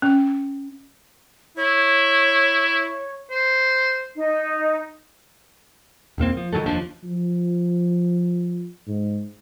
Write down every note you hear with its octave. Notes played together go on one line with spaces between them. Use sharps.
C#4
E4 C#5
C5
D#4
E1 E2 A#3 C4
F3
D#3 F#3 G#3 A3
F1 D#2 F3 D4
F3
G#2